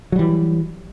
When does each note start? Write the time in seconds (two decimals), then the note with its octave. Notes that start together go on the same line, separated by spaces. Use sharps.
0.12 F#3
0.16 G3
0.19 E3